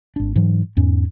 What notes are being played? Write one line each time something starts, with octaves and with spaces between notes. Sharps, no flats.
G#1 D4
G#2 E3 F#3
E2 G#2 C#4